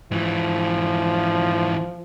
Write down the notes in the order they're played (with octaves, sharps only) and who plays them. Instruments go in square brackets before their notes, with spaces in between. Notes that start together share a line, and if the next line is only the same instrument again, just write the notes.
[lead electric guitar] G#2 E3 [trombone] F3